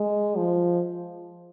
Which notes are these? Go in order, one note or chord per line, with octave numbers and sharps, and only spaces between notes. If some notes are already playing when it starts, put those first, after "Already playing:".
Already playing: G#3
F3